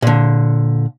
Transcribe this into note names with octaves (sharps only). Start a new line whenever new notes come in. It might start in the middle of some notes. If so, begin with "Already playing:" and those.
A#2 D3